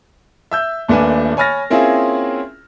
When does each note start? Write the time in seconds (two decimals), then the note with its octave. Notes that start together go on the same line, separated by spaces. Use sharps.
0.51 E5 E6 G6
0.88 D#1 A#2 A3 D4 B4 G#5
1.37 C#5 G#5 B5 F6 A6 A#6
1.70 A#3 C4 C#4 E4 F4 G#4